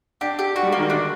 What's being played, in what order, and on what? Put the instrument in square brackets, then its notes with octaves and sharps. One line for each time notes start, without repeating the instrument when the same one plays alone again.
[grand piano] D4 [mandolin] G4
[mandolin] G4
[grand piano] D4 [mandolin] F#4
[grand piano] G3
G#3
[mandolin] A#3
[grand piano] D#3
[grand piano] D3 [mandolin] D4